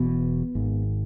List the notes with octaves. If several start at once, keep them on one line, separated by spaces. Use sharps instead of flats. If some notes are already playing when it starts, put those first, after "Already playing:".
Already playing: E1 E2 B2 B3
G#1 G#2